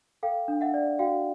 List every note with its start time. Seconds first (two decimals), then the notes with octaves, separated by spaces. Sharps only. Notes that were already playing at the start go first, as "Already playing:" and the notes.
0.23 A4 F5 G5
0.48 D4
0.61 E5 F#5
0.74 D5
0.99 F#4 F5 G5